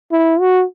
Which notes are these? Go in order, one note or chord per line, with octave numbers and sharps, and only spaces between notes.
E4
F#4